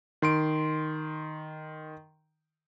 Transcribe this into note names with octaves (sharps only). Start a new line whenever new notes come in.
D#3 C6 D7